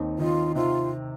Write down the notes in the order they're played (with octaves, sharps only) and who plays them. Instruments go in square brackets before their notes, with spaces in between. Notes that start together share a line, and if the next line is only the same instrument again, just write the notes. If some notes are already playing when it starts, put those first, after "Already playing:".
Already playing: [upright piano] D#2 D#3 C4 D#4
[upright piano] D#2 D#3 C4 D#4 [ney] F4
[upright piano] C3 D#3 C4 [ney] F4